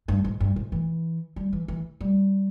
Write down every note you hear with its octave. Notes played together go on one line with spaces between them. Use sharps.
G2
G#2
G2
G#2
E3
G3
E3
E3
G3